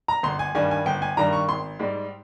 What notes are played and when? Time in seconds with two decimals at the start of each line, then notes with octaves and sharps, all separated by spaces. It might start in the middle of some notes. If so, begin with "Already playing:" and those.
0.08 A#5
0.23 G1 C6
0.39 G#5
0.55 G2 D#3 G3 G#5
0.71 G#5
0.86 G1 G5
1.02 G#5
1.17 G2 D#3 G3 A#5
1.33 C#6
1.49 G#1 C6
1.79 G#2 G3